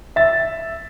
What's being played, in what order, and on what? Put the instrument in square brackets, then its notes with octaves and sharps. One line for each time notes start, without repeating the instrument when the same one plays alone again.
[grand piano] E5 A6